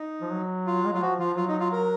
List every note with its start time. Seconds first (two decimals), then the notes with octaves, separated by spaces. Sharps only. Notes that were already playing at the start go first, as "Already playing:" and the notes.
Already playing: D#4
0.21 F3
0.31 F#3
0.67 F4
0.85 G#3
0.93 F#3 F4
1.02 F3 F#4
1.19 F3 F4
1.37 F#3 F4
1.49 D#4
1.60 F4
1.72 A#4